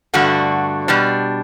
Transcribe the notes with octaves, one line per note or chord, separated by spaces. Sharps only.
G2 D3 A3 D4 F#4
B2 G3 D4